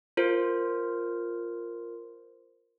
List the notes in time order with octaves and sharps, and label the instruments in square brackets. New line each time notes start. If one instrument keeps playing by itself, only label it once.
[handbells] F4 A#4 C5